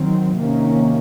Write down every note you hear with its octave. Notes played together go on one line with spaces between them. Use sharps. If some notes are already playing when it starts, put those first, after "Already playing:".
Already playing: D#3 F#3 C4
C3 D#3 A#3 C#4